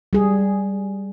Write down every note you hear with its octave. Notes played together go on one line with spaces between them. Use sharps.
G3 G#4